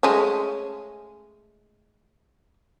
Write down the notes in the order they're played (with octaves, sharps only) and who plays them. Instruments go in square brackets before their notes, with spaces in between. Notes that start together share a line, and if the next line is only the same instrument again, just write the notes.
[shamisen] G#3 A3 C#4